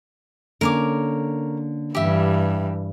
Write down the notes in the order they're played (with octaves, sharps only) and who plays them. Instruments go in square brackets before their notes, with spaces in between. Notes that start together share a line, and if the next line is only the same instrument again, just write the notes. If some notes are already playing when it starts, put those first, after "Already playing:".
[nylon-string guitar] D3 A#3 C#4 [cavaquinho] A#4 C#5 D6
[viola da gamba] G2 E3 [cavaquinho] G4 E5